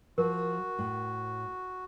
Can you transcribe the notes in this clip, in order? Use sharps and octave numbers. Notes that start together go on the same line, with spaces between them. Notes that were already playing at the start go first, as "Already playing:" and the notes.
F3 F#4 A#4
A2